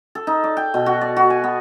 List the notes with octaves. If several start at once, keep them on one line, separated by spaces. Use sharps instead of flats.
A4
D#4
D5
G5
B2
F#4
D5
F#4
G#5
B3